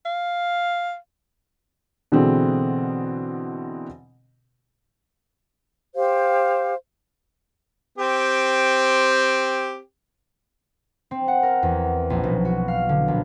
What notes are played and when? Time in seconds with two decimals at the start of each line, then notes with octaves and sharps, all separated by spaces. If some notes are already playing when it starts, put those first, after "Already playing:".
0.06 F5
2.12 B2 D3 E3 G#3 C4
5.95 G4 C5 F5
7.98 C4 G4
11.11 C4
11.28 F#5
11.43 A#4
11.63 E2
12.10 A#1
12.24 B1
12.45 F#4
12.68 F5
12.89 D3
13.08 A#1